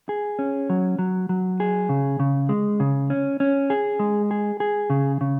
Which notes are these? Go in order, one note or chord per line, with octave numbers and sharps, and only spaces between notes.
G#4
C#4
F#3
F#3
F#3
G#4
C#3
C#3
G#3
C#3
C#4
C#4
G#4
G#3
G#4
G#4
C#3
C#3